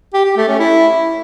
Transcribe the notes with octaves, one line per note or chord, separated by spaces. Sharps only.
G4
G4
A3
C#4
E4